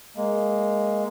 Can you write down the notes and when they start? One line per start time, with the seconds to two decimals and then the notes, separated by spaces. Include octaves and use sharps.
0.17 G#3 A#3